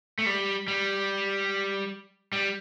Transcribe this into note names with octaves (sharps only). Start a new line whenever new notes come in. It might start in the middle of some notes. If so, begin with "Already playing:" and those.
A3
G3
G3
G3